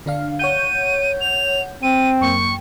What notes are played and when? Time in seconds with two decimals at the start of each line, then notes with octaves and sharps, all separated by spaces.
0.06 D3 D4 F5
0.39 C#5 F#5 G6 D#7
1.21 F7
1.83 C4 D#7
2.21 F#2 A#3 G5 C#6